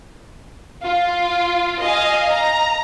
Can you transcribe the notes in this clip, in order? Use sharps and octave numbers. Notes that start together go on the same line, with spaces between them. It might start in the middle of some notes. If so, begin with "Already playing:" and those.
F4
D#5 F5 G#5
A#5